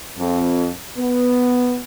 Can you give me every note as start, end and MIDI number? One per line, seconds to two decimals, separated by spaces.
0.18 0.67 41
0.97 1.79 59